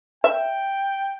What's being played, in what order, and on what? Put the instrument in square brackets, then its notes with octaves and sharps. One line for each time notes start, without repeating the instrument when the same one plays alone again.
[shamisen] E5 [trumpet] G5